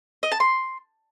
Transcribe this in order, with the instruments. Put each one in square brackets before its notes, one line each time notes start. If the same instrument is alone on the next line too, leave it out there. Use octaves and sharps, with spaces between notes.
[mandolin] D#5
A5
C6